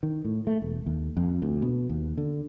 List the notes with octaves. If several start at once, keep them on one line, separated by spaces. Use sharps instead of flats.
D#3
A2
A3
E1
D#2
F2
D2
B2
D#2
D3